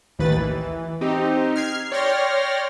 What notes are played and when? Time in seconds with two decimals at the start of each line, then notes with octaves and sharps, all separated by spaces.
0.19 A1 D#2 D#3 B4 A6
0.37 E3
1.01 C4 D#4 G4
1.56 F6 G#6 C7
1.92 C#5 D5 G5 C6 F6 A#6